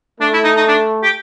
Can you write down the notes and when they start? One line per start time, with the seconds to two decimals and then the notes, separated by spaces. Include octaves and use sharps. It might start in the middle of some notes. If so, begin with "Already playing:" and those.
0.21 A3 D4
0.33 E4
0.44 D#4
0.57 D#4
0.68 D4
1.03 G4